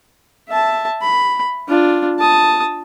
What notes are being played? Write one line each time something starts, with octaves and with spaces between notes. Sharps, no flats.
E5 A5
B5
D4 F4
A5 D#6